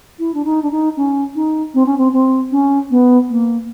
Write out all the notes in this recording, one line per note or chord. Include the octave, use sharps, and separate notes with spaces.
E4
D4
D#4
D4
D#4
C#4
D#4
C4
C#4
C4
C4
C#4
B3
A#3